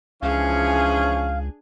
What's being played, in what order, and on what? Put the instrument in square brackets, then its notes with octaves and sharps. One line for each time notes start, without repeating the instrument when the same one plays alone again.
[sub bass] C#2 [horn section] E3 F3 C#4 [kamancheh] D4 G#4 [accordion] F5